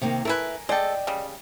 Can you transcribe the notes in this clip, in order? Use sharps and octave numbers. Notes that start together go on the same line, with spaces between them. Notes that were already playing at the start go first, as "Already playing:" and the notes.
C3 D#3 A#3
A3 E4 A#4 B4 G#5
G#3 A4 D5 D#5 G5
C#3 G3